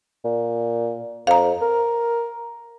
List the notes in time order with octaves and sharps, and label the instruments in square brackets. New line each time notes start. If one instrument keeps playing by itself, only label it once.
[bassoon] A#2
[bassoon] F2 [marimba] F5 A#5
[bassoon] A#4